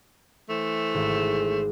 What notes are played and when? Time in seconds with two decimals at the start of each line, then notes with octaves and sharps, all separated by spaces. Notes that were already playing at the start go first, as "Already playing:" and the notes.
0.50 E3 A3 C5
0.94 G#1